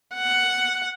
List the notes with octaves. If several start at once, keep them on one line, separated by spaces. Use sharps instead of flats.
F#5